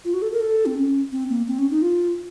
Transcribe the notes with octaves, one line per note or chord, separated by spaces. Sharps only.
F4
F#4
A4
A#4
A4
C4
C#4
C4
A#3
C4
C#4
D#4
F4